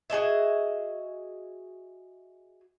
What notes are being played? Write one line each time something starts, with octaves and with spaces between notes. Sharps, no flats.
F#4 G#4 D#5 E5